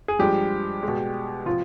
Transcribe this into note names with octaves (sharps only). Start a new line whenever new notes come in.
G#4
G2 F3 G#3 G4
B2 G#3
C3 F3 F4